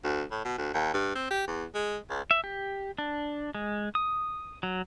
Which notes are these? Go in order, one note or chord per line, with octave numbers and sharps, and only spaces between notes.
D2
A2
B2
D2
D#2
G2
C4
G4
E2
G#3
C#2
E5
G4
D4
G#3
D#6
F#3